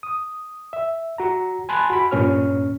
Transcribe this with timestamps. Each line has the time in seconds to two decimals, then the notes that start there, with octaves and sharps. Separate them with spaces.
0.03 D#6
0.73 E5
1.18 F#4 A#5
1.69 G#5 A5 B5 C6 F#6
1.90 F#4 B5
2.11 G2 A#2 C#4 C#5 F6